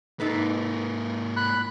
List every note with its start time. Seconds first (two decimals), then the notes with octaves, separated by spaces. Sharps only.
0.20 G#2 A#3 D#4 A4 B4
1.37 B5 F#6